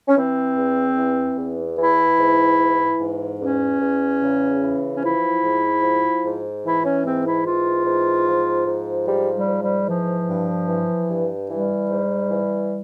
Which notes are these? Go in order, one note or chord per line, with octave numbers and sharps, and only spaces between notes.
C#4
E3 C4
E2
E3
E2
E3 E4
G#2
E3
G#2
E2 C#4
E2
C#3
E3
C#4
F3 E4
G#2
F3
G#2
E3 E4
C#4
G#2 C4
E4
E3 F4
G#2
F3
G#2
F3 G3
G3
G#2
G3
E3 F3
G2
E3
G2
E3 G3
G#2
E3